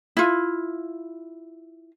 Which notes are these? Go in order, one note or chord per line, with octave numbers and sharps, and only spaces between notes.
E4 F4